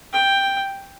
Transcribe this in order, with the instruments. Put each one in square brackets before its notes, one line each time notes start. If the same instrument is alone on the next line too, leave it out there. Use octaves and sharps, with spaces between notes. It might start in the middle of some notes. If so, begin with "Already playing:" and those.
[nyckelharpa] G5